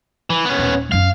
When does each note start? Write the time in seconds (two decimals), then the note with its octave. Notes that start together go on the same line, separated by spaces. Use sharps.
0.30 E3
0.45 B3 C#4
0.58 D#1
0.92 F#2 B3 F5